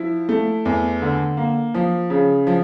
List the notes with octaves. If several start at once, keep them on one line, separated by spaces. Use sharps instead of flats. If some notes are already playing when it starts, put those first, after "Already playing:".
Already playing: F3 E4
A3
E2
D3
A#3
F3
C#3
F3